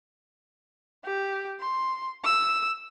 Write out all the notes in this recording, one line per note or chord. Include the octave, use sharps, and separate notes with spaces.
G4
C6
E6